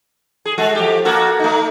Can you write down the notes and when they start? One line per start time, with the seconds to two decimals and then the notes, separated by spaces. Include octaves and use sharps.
0.46 G#4
0.58 G#3 F#4 A4
0.75 F3 G4
1.05 A#3 F#4 A4
1.39 A3 D#4